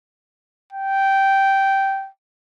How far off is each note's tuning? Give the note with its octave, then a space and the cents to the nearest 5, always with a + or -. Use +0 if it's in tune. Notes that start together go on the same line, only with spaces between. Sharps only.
G5 -10